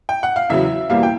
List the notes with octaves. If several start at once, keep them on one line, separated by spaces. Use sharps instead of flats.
G5
F#5
F5
E2 C#3 F#3 E5
E2 B2 G3 A#3 F5
G5